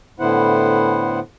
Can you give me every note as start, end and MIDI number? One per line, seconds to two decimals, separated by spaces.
0.20 1.20 45
0.20 1.20 50
0.20 1.20 59
0.20 1.20 64
0.20 1.20 72
0.20 1.20 78